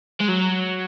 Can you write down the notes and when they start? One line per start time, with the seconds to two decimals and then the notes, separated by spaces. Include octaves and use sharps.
0.21 G#3
0.29 F#3